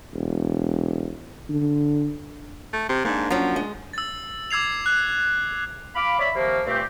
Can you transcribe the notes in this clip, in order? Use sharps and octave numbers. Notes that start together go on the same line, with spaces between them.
E1
D3
A3
C3
G#2 A#3 D4
F3 F#3 C#4
G#3
E6 A6
D6 E6 G#6 C7 F7
F#6
F5 B5 D6
C#5 D5 E5 B5
C3 D#3 F3 A#3
G2 A#2 A3 C4 G4